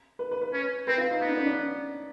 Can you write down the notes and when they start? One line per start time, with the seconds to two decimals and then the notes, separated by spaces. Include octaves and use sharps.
0.19 B4
0.31 B4
0.42 B4
0.53 C#4
0.87 C4 B4
0.98 F4
1.10 D#4
1.20 B3 D#4
1.29 D4
1.37 C#4
1.46 D4